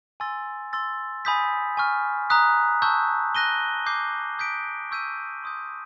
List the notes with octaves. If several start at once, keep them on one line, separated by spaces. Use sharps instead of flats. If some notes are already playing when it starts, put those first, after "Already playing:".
G#5 C6 E6 A6
C6 E6 A6
G#5 B5 D#6 G6 B6
G#5 C#6 F6
A#5 D#6 F#6 B6
A5 C#6 E6 G6
F#6 A#6 D#7 G7
D6 G6 C7
D#6 G6 B6 D7
C#6 E6 G6 B6 D#7
C6 D#6 G6